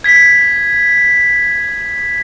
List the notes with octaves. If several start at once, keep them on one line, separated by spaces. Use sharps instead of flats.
G#6 B6